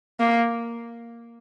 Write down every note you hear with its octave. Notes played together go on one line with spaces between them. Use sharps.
A#3